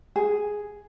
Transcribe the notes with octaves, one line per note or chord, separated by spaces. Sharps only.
G#4